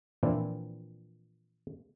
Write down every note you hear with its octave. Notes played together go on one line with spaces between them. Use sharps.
A#2 E3 F3 C4 D4 E4